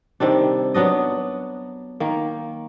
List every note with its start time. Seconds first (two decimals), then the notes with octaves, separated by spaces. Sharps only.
0.20 C3 D#3 G3 D4
0.74 F#3 B3 D4 D#5
2.00 D#3 A#3